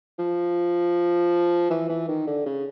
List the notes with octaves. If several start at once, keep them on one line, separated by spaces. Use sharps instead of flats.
F3
E3
E3
D#3
D3
C#3